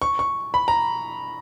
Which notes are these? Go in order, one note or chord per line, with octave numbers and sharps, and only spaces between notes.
C#6
C#6
B5
A#5